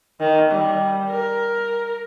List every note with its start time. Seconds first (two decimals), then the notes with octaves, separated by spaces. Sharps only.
0.20 D#3
0.51 G3
1.11 A#4